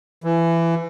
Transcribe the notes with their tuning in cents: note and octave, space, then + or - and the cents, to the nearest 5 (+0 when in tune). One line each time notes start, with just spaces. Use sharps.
E3 +20